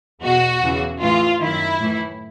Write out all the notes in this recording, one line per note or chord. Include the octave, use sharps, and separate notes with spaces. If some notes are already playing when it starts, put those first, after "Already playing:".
E2 B2 F#4
E2 C#3 E3
A2 E3 F4
F#2 D#3 E4
A2 E3